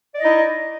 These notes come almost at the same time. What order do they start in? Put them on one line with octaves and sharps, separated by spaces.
D5 D#5 E4 D#4